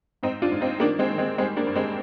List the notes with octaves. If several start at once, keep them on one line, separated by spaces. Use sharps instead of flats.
G#2 C4 D#4
D4 F4
G#2
C4 D#4
D#3 A#3 D4
G#3 C4
D#3
G#3 C4
G3 G#3 C4
A#3 D4
G2
G#3 C4